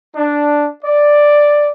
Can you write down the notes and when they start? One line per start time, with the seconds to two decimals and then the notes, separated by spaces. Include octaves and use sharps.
0.15 D4
0.83 D5